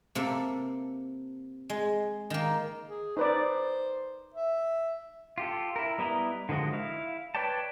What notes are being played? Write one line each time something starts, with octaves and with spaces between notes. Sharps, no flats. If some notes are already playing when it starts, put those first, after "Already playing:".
C3 A#3 A4
G#3
D#3 A#3
G#4
D#4 B4 C5 D5
E5
F4 G4 A4
E4 A#4
G3 B3 E4 D#5 A#5
D3 D#3 F3 G#3 F#4
E4 F5
B4 C#5 D5 G5 A5